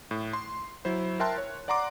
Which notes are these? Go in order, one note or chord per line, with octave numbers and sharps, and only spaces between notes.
A2
C6
F#3 E4 C5
A#4 E5 G5 A5 C6 F#6
C#5
D5 F#5 A#5 C6 D6